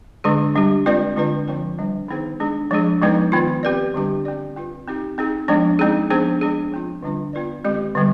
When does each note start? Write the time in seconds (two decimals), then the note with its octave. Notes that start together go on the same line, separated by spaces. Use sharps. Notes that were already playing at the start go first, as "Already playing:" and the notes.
0.24 D3 G#3 D4 G#4
0.55 G3 D4 G4
0.86 G#3 C4 F4 B4 D5
1.17 D3 G#3 D4 F4 B4
1.48 D3 F3 C4 F4 B4
1.79 D#3 G3 D4
2.09 D#3 B3 D#4 G#4 C5
2.40 G#3 D4 G#4
2.71 F3 G#3 D4 G#4
3.02 F3 G#3 B3 D#4 B4
3.32 D#3 B3 F4
3.63 C4 G4 B4 D5
3.94 D3 G3 D4 G4
4.25 C4 G4 D5
4.56 C4 F4 B4
4.87 C4 D#4 G4
5.18 C4 D#4 G#4
5.48 F3 G#3 B3 D4
5.79 G#3 C4 D#4 G#4
6.10 F3 B3 D4 G#4 C5
6.41 G#3 D4 G#4
6.72 F3 C4 F4
7.03 D3 G3 D4 F4
7.33 B3 F4 B4 D5
7.64 D#3 G#3 C4 G4
7.95 D3 G3 B3